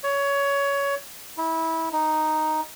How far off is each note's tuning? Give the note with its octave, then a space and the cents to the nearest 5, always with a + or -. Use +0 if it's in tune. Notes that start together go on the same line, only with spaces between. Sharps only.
C#5 +20
E4 -20
D#4 +0